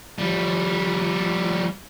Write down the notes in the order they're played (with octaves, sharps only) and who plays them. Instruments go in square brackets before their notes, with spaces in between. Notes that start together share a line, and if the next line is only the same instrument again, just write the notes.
[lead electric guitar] F3 G3